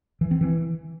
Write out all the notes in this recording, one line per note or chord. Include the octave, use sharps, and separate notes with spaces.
E3
C4
E3